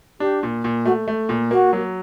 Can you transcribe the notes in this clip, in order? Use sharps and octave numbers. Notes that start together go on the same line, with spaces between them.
D4 G4
A#2
A#2
A3 F#4
A3
A#2
A#3 F#4
F#3